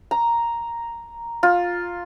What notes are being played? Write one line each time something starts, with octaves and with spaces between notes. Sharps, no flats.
A#5
F4